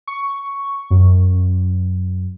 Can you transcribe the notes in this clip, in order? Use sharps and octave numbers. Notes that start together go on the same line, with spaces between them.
C#6
F#2